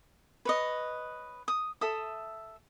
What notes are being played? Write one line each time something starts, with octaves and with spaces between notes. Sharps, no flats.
B4 C#5 D#5
D#6
A4 E5 D#6